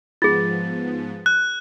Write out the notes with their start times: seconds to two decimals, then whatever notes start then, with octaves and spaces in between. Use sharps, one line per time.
0.22 G#2 F3 B3 F4 G#4 A6
1.26 F#6